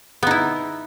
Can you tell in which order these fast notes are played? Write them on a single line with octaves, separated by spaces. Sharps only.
B3 D#4 E4